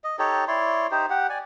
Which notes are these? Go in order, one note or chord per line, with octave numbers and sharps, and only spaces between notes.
D#5
D#4 G4 A4 C#5
E4 C#5 D5 C6
D#4 G4 C5
G4 F#5
D5 G#5